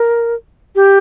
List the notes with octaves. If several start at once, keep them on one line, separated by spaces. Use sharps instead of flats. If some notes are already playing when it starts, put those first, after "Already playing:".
Already playing: A#4
G4